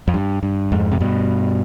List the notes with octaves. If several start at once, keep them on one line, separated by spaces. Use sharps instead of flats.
F2
G2
G2
F2 G#2
C3
G2 B2